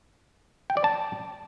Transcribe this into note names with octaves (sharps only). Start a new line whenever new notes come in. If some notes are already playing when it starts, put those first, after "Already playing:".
G5
D5
A5